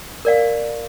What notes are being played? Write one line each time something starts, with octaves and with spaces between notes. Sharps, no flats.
A#4 D5 F5